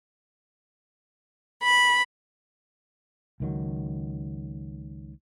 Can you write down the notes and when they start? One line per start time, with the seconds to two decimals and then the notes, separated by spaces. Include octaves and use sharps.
1.62 B5
3.40 C#2 D#3 F#3